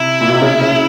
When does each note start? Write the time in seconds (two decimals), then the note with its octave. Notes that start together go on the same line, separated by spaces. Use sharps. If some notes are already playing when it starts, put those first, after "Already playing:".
Already playing: C3 E4
0.21 A#2
0.28 B2
0.35 C3
0.42 C#3
0.61 C#3